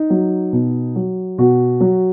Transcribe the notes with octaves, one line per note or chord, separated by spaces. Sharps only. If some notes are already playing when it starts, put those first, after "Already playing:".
Already playing: D#4
F#3
B2
F#3
B2 F#4
F#3